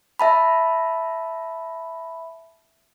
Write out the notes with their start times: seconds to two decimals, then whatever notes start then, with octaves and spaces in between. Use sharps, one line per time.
0.19 E5 A5 B5